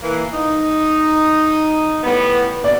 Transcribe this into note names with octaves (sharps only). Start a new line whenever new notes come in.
E3 A#3
D#4
A2 G3 B3
B2 D5